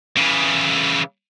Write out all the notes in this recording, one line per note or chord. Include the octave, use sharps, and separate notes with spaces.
C#3 E3